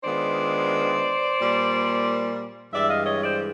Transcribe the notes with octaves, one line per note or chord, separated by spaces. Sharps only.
D#3 G#3 B3 D4 F4 C5 D5
A#2 G3 A#3
G2 E3 G#3 D5 E5
D#5 F5
C#5 D#5
C5 D5